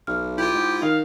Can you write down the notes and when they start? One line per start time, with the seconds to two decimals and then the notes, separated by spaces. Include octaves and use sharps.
0.07 B1 F6
0.38 E4 F4 G4
0.54 G#2
0.82 D#3 D#4 F5